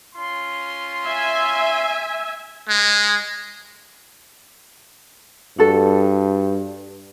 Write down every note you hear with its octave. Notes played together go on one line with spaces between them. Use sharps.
C#4 F4 C6
E5 G#5
G#3
G2 F#4 A4